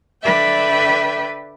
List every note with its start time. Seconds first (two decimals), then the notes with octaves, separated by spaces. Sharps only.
0.23 D3 B4 D5 E5 G5